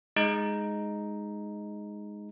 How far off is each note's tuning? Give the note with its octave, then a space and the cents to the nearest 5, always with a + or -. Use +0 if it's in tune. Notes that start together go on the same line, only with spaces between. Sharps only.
G#3 +0 D#4 +0